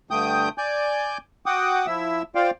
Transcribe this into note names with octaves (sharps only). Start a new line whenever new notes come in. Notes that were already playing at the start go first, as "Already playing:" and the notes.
G2 D3 A3 G5 D#6 G6
D5 G#5 G6
F#4 F#5 G5 D6 D#6
F3 E4 E5 E6
F4 C5 D5 F5 G5